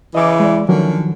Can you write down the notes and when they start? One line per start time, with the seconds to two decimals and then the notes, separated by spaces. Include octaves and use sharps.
0.15 C#3 E3 D#5 D6
0.40 G#3 D5
0.69 D3 D#3 F3 F#3 C#4 A#4